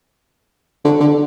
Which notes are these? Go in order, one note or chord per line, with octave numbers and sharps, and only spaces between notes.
D3
D3